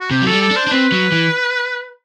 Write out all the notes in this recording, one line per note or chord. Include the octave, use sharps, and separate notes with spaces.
F#4
C3 G4
F#3 A4
G3
A4
D4
C5
D4
C4 B4
F#3
E3